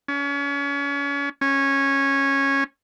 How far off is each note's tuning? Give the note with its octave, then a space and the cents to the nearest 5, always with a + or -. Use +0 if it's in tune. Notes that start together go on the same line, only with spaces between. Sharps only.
C#4 +35
C#4 -10